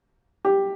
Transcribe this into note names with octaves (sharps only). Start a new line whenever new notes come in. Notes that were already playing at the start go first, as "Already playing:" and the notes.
G4